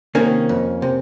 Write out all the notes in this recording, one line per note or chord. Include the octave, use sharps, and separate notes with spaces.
C3 D#3 A#3 C#4
F2
C3